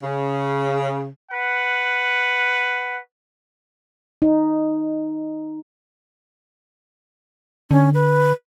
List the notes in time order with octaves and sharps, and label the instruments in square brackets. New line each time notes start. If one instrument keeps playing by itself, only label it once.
[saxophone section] C#3
[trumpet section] B4 F#5
[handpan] D#4
[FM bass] D3 [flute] C#4
[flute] B4